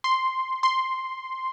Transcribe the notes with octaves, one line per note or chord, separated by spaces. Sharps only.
C6
C6